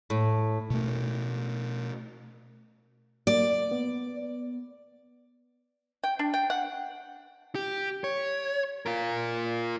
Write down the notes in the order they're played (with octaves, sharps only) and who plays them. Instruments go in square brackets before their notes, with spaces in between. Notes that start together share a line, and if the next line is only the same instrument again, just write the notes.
[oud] A2
[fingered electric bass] B2 A3
[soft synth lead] A#3 [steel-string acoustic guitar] D5
[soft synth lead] B3
[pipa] G5
D4
G5
F#5
[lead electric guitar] G4
C#5
F4 A#4